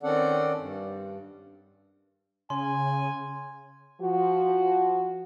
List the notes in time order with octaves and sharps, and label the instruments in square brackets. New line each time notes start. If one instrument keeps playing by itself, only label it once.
[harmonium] D#3 C4 C#4 A4 D5 F#5
G2
[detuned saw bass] C#3 [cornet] G#5 [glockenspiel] C6
[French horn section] F3 F#4